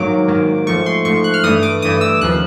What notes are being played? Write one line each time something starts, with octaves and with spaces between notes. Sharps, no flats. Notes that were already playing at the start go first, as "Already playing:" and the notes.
Already playing: G#2 D#3 F#3 A#3 D6
G#2 D#3 F#3 A#3
G#2 F3 A3 C#6
C6
G#2 F3 A3 C#6
F#6
F6
G2 E3 A3 D#6
D6
G2 E3 A3 D#6
E6
D#2 C#3 F3 F#6